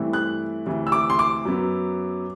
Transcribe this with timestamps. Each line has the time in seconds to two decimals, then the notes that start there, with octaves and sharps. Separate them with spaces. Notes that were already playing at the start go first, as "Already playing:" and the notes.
Already playing: G2 E3 A3 C4 E4
0.13 F#6
0.66 D2 C3 E3
0.87 E6
0.92 D6
1.10 C6
1.19 D6
1.45 F#2 F#3 B3